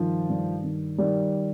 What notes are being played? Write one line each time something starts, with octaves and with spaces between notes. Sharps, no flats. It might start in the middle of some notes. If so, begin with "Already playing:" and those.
Already playing: G2 D#3 F3
G2
D#3
D#3 G3